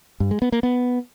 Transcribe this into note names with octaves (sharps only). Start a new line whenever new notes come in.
G2
G#3
B3
A#3
B3